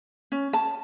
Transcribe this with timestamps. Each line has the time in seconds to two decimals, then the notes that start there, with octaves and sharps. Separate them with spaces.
0.32 C#4
0.53 A5